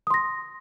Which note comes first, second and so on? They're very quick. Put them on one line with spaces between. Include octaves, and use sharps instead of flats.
D#6 C6 A#6